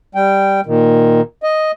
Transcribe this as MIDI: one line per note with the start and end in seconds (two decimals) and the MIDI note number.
0.15 0.61 55
0.15 0.61 79
0.66 1.21 46
0.66 1.21 51
1.43 1.71 75